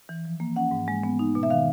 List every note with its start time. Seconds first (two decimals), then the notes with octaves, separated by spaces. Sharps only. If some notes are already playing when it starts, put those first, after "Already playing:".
0.09 E3
0.25 F3
0.40 A#3
0.56 C#4 F#5
0.71 G#2
0.88 G#3
1.03 B3
1.19 D#4
1.35 B2
1.43 E5
1.50 D#3 F5